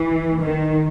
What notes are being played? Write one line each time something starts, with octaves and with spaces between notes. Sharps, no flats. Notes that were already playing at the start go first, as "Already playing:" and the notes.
Already playing: E3
D#3